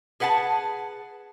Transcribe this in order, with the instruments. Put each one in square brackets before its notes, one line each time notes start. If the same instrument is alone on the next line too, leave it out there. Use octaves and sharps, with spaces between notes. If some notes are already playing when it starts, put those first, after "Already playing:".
[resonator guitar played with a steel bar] G#4 B4 F#5 G#5 A5